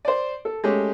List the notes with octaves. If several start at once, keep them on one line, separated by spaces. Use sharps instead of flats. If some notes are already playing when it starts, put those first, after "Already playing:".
C5 D5
A4
G#3 A3 C#4 G4